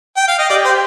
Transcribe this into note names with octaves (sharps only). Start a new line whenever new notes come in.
G5
F5
D#5
G4 D5
C5